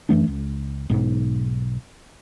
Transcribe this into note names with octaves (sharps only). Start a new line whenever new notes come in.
F#2 E3 A3 D4
C#2
B1 G#2